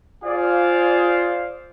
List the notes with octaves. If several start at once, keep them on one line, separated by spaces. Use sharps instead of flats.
F4 G#4 C5 D5 F5